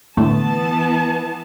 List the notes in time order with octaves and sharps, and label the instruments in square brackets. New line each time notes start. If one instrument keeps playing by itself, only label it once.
[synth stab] A2 D3 A3 [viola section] E3 B3 A5